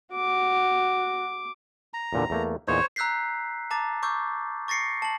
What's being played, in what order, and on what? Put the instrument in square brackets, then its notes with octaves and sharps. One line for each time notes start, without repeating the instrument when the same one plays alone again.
[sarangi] F#4 [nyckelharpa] D6
[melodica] A#5
[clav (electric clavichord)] E2 A#2 D3
E2 A3 A#3
[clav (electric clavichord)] E2 A#2 D#4 [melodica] C5 C#5
[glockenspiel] A#5 E6 F#6 G6 B6 C7
A5 A#5 D6 A6
C#6 D6 E6 G6
C#6 A6 A#6 C7 C#7
A5 F#7